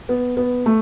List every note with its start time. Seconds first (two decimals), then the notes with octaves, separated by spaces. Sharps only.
0.09 B3
0.37 B3
0.66 A3